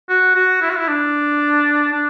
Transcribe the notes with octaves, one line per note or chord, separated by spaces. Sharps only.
F#4
F#4
E4
F#4
E4
D4
D4